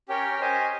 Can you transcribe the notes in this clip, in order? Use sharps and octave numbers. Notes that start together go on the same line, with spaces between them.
C#4 G4 A#4 C#5 G5
C#4 G4 C5 D#5 G#5